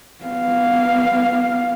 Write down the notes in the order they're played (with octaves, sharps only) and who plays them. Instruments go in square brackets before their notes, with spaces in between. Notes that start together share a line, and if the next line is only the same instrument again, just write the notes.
[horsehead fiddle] B3 F5